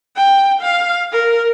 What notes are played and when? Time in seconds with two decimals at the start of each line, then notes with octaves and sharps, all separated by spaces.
0.16 G5
0.61 F5
1.12 A#4